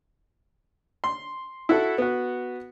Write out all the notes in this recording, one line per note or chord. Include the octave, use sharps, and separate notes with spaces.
C6
E4 F#4 A4
B3 F#4